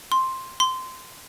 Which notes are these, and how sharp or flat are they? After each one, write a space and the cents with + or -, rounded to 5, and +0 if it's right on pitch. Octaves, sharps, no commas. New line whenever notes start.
C6 +5
C6 -15